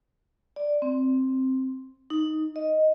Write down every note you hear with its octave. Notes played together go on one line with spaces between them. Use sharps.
D5
C4
D#4
D#5